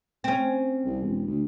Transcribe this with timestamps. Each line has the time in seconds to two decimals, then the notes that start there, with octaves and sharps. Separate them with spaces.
0.24 C4 C#4
0.85 C2
1.02 E1
1.26 D2